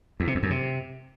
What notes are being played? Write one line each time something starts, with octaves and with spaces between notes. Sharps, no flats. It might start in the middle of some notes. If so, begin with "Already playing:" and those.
E2
C3
E2
F#2
C3